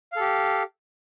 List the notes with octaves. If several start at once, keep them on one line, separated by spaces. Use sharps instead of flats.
G4 A4 F5